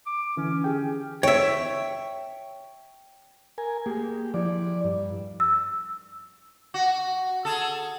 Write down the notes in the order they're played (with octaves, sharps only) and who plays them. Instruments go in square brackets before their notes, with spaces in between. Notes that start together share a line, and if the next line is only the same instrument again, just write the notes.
[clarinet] D6
[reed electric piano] D3 E3 [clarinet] C#4
[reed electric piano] G4 G#4 G5
[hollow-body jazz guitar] C#5 E5 [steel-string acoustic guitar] G5
[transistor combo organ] A#4 G#5
[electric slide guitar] A#3 G#4 [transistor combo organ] G4
[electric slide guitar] F3 E4 [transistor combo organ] D5
[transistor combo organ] G2
[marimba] E6
[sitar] F#4
G#4 A4